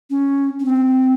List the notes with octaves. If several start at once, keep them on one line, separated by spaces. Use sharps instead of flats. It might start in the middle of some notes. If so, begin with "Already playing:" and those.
C#4
C#4
C4